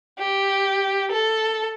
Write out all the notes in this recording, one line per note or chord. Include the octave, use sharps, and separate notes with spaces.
G4
A4